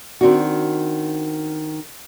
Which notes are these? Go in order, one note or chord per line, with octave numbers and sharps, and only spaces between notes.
D#3 C4 D4 F#4